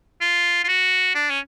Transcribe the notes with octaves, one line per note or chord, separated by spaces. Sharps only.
F4
F4
F#4
D4
C#4